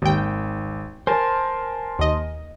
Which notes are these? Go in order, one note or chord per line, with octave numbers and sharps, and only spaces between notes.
G#1 D#2 G5
A#4 C5 G#5 A5
D#2 D#5